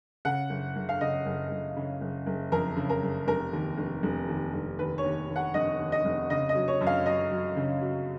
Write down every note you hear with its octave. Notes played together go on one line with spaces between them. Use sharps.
C#3 F#5
F#1
F#1
F5
C#3 D#5
F#1
F#1
C#3
F#1
F#1
F2 A#4
C#3
A#4
F#1
F1 A#4
D#2
F1
F1
D#2
F1
D#2 B4
C#5
D#2
D#2
F#5
F1 D#5
D#2
D#5
F1
C#3 D#5
D#5
F#3
C#5
F#2
F5
F#2 D#5
F#3
C#3
F#3